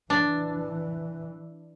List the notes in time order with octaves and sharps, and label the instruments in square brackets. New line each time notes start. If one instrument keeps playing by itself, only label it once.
[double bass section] E3 [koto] D4